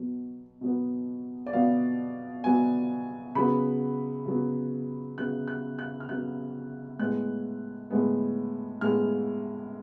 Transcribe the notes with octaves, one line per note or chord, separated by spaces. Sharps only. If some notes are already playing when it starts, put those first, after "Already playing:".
Already playing: B2 F#3 B3
B2 F#3 B3
D5
B2 F#3 B3 F5
B2 F#3 B3 G#5
C#3 F#3 B3 B5
C#3 F#3 B3
C#3 F#3 B3 F#6
F#6
F#6
F6
C#3 F#3 B3 F#6
A2 G#3 B3 F#6
A2 G#3 B3
A2 G#3 B3 F6